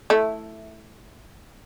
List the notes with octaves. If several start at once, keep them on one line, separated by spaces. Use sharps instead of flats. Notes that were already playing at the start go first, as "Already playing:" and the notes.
A3 E4